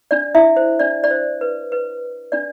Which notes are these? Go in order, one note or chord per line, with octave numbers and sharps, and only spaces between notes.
D4 D5
E4 E5
C5
D4 D5
D5
C5
B4
B4
D4 D5